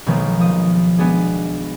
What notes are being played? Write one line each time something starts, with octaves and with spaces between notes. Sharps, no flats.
B1 B2 D#3 F3 G#3 A#3
F3 D#6
G#3 B3 D4 G#4